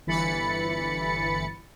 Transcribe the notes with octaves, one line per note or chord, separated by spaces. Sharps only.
G1 E3 B5 A6 C#7